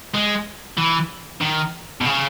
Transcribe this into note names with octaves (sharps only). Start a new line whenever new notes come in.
G#3
E3
D#3
B2
C#3